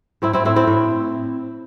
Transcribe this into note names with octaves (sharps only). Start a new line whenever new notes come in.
A2 C4 E4
C4 E4
A2 C4 E4
C4 E4
A2